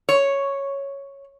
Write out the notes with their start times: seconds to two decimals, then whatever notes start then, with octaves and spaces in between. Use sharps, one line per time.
0.09 C#5